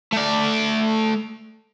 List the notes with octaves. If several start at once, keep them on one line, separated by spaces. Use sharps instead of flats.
A3 D5